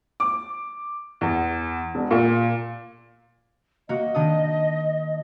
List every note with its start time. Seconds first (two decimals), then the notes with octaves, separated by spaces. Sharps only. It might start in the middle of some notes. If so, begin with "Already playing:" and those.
0.20 D6
1.21 E2
1.95 E1
2.11 A#2
3.89 A#3 F#4 D#5
4.14 D#3 D4 D#6